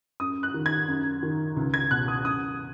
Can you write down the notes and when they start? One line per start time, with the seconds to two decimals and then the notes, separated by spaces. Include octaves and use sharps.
0.20 F#2 D#6
0.43 F#6
0.54 D#3
0.66 G#6
0.88 F#2
1.23 D#3
1.57 C#2
1.74 G#6
1.91 B2 F#6
2.08 D#6
2.25 F#2 D#6